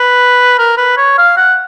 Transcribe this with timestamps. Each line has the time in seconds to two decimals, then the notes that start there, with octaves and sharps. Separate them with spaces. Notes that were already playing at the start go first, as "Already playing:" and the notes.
Already playing: B4
0.58 A#4
0.78 B4
0.97 C#5
1.18 F5
1.37 F#5